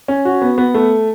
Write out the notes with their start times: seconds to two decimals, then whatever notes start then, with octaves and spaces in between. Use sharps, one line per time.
0.08 C#4
0.25 F#4
0.42 B3
0.58 B3
0.74 A3